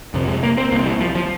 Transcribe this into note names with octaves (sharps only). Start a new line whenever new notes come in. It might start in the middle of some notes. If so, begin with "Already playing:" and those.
F2 C3
G#3
A#3
C4
C2 C3 A#3
G3
F3
F3